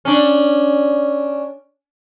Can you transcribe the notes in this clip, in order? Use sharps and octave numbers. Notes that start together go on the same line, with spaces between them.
C#4 D4